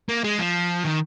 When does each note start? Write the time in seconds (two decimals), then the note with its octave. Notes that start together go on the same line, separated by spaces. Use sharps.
0.09 A#3
0.24 G#3
0.39 F3
0.84 D#3